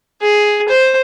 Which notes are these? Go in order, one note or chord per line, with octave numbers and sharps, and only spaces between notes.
G#4
C5